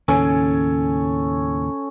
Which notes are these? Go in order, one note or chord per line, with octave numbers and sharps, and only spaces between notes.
D#2 A2 C#3 C#4 A4 G#5